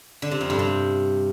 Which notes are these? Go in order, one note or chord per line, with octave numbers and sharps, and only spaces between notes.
D3
C3
F2
G2
C3